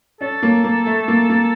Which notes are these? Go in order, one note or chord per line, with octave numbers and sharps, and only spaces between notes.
C#4 A4
A#3
A#3
A3
A#3
A#3